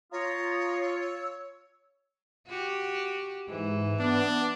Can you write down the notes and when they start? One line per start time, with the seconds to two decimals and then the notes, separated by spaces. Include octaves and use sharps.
0.12 F4 C#5 A#5 D#6
0.85 E6
2.47 F#4 G4
3.48 G#2 E3
4.00 B3 D4